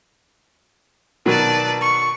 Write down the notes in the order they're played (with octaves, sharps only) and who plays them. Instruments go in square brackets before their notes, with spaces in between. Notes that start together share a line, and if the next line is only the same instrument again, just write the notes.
[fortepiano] B2 D#3 F#3 [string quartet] B4 D5 A5
[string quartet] C#6